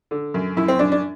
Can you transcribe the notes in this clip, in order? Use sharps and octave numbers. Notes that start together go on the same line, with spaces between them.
D3
F#2
F#2 E4
C4
F#2 D4
D4